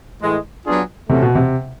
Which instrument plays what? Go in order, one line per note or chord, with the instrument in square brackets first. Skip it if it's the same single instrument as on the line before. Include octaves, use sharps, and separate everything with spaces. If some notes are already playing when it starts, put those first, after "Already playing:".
[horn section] A2 E3 G#3
F#3 B3 D4 F4 G#4
[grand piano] C3 [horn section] E3 A3 C#4 F#4 A4
[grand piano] B2
C3